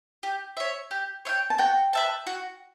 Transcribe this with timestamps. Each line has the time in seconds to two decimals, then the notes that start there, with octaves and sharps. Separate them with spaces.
0.23 G4
0.57 C#5 E5
0.91 G4
1.25 C#5 E5 G5
1.50 A5
1.58 F#4 G5
1.93 B4 E5 A5
2.27 F#4